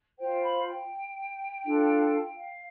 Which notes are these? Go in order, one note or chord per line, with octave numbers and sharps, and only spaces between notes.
F4 C5 G5
B5
G5
D4 F4 A4
F5